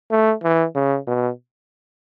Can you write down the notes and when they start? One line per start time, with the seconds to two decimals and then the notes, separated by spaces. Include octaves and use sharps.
0.11 A3
0.43 E3
0.75 C#3
1.07 B2